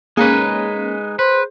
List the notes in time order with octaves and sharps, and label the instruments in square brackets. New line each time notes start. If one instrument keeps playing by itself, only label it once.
[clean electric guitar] G#3 D#4 B4 [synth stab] A#3 C#4 [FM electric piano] G#4
[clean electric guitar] B4 [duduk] C5